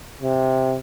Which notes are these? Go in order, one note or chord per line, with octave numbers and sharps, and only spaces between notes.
C3